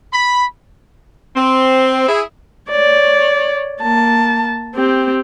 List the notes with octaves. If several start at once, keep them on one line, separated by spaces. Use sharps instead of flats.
B5
C4
E4 G#4
C#5 D5
A#3 A5
C4 G4